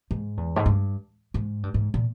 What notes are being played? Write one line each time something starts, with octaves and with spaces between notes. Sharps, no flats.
G#2
E2
G#2
G2
G#2
G2
G#2
A#2